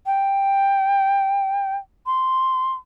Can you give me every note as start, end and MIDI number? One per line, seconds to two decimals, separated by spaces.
0.06 1.76 79
2.06 2.72 84